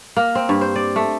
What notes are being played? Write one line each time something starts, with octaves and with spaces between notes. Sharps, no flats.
A#3
C4
G2
C5
D5
A3